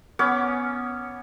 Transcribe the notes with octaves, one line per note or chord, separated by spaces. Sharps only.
B3 C#4 C#5 D6